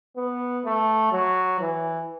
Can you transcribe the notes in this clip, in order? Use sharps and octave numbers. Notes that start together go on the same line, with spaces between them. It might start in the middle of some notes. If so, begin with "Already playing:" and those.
B3
A3
F#3
E3